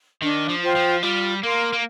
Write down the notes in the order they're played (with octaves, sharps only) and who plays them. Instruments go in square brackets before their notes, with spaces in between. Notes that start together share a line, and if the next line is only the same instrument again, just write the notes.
[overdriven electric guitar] D#3 [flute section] D4
[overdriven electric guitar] F3
[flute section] F4 C5 G5
[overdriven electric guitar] F3
[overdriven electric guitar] G3 [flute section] F4
[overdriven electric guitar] A#3 [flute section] A#4 F5 C6
[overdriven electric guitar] A#3